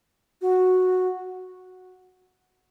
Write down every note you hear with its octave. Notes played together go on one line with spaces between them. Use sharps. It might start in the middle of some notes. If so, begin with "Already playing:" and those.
F#4